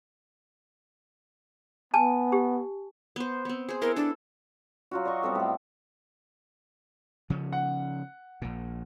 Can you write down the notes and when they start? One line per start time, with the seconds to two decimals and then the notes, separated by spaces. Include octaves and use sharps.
1.94 B3 G#5 A5
2.32 G4
3.16 B3 C5
3.45 B3 C4
3.69 G#4 C5
3.82 B3 E4 A#4 C6
3.96 D4 A4
4.91 F#3 F4 F#4
5.05 D5 D#5 C6 C#6
5.23 G3 B3 C4 A4
5.35 A2 A4
7.30 C#3 F3 C#4
7.53 F#5
8.42 A#1 A#2